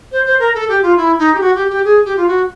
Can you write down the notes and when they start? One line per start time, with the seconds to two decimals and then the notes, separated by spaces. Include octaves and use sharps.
0.12 C5
0.25 C5
0.39 A#4
0.55 A4
0.69 G4
0.83 F4
0.97 E4
1.18 D#4
1.35 G4
1.41 F#4
1.55 G4
1.70 G4
1.84 G#4
2.05 G4
2.17 F4
2.27 F#4